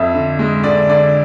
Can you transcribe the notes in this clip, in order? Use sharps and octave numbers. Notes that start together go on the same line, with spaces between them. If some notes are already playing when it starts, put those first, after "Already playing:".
Already playing: F2 E5
D3
G#3
D3 D5
D3 D5